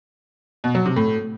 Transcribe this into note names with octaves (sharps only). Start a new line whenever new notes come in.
B2
F#3
C3
A2